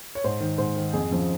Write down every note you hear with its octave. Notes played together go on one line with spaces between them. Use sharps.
C#5
G#2 C5
D#3
G#2 C5
D#3
F2 G#4
C#3 F3